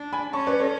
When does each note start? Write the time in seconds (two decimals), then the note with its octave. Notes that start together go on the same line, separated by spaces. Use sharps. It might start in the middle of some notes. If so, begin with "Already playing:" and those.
Already playing: D4
0.13 G#5 B5
0.33 C#4 A5 C#6
0.46 B4 D5
0.60 A4 C#5